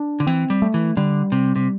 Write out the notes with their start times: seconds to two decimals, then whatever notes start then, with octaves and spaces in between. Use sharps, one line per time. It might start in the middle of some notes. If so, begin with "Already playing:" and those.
Already playing: D4
0.20 D3
0.27 E3 C4
0.50 G3
0.62 A3
0.74 E3
0.97 D3 G3
1.32 C3
1.56 C3